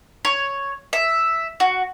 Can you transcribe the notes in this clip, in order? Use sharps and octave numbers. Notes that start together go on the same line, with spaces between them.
C#5
E5
F#4